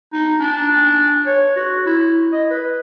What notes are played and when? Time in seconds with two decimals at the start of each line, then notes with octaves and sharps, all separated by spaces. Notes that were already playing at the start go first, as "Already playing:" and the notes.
0.13 D#4
0.40 D4
1.26 C#5
1.56 F#4
1.86 E4
2.32 D#5
2.50 B4